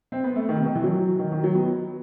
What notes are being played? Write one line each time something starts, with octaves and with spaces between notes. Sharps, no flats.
C4
B3
A3
D#3
C3
D#3
E3
F#3
D#3
D#3
F#3
B3